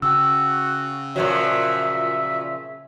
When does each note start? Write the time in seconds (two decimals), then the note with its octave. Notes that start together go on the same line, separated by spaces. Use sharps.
0.02 C#3 F#4 G5 E6
1.16 A#2 F3 F#3 E5